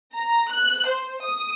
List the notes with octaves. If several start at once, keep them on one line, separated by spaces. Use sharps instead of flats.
A#5
F#6
C5
D#6